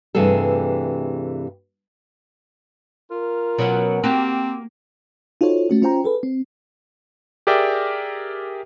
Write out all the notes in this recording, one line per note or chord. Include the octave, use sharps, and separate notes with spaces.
G2 C3 E3 A3 G#4 A4
F4 A#4
B2 F#3 C#4
A#3 C4 F#4 G4
D#4 F4 F#4 A4 C5 C#5
A3 C#4 F#4
C#4 F4 C5 G5 A#5
G#4 A4 B4
C4
G4 G#4 A#4 D5 E5 G5